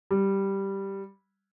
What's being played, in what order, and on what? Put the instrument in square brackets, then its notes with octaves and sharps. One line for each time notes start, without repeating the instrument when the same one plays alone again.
[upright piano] G3